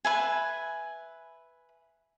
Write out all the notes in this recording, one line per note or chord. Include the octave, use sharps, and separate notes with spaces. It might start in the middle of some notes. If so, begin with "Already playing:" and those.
B4 E5 G#5